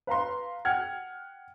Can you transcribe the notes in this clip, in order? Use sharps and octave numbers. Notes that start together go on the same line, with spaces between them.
B4 F5 A#5 C6
F#5 G5 F6 G#6